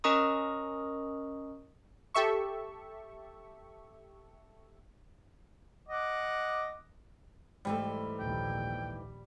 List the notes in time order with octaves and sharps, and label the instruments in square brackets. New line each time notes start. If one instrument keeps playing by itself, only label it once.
[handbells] C#4 A#4 D#5 A#5 C#6 D#6
[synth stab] G4 A4 E5 C#6
[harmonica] D#5 F#5 D6
[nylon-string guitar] G#2 E3 A3 [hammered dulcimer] G3
[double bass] A#1 D#2 [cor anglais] G5